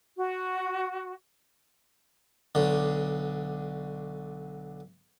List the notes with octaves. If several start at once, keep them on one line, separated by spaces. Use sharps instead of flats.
F#4
B1 D3